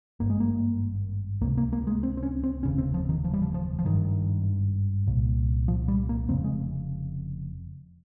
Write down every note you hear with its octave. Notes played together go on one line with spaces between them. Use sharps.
G#1 G2 A#3
G#3
A#3
C#2 C3 A#3
A#3
A#3
G#3
C4
C4
C#4
C4
F1 D#2 C#3 C#4
C4
F3
D#3
F3
G3
F3
F3
F3
G#1 G2 D#3
C2 A#2
F3
G3
A#3
F1 F2 C#3 C4
G#3